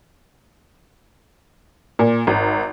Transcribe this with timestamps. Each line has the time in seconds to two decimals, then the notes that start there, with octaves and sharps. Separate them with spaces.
1.99 A#2
2.27 G#1